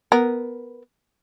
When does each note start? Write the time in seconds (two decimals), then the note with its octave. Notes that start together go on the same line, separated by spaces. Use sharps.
0.12 B3 A#4